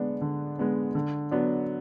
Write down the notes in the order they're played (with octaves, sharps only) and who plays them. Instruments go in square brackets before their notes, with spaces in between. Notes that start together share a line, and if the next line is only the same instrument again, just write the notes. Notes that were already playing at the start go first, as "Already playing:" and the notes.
Already playing: [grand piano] D3 G#3 B3 D4
D3
G#3 B3 D4
D3
F#3 B3 D4